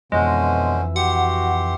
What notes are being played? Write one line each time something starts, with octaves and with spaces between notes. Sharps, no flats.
F2 B2 D3 E3 G#3 C#4 C5
F#4 G4 F#5 C6